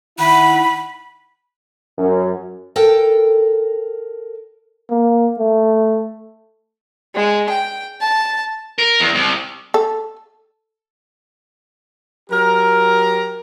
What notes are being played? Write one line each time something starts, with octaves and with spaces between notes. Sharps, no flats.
D#3 E4 F#5 B5
F#2
A4 A#4 G5
A#3
A3
G#3
G5
A5
A#4
E2
C2
A4
F#3 G4 A#4